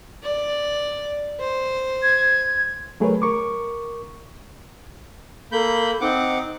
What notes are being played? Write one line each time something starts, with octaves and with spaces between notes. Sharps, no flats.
D5
C5
G#6
F#3 A3 G#4 A#4 B4 C#5
A#4 C#6 D6
A#3 A4 B5 G6
C4 D#4 F#5 D6